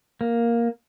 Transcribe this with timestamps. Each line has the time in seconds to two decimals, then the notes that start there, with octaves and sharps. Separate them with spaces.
0.21 A#3